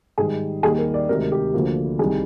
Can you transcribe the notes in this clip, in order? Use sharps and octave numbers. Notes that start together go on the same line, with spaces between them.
G#2 D#3 G3 G#4
D#2 D#3 G3 G#4
A#4
D5
D2 C3 D#3 G#3 A#4
G4
D2 D3 F3 A#3
C2 C3 D#3 G3 G#4